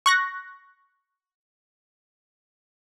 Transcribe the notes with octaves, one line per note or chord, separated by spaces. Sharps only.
C#6 F#6 A#6